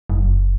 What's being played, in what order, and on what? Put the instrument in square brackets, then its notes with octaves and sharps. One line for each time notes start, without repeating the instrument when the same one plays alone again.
[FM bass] F#1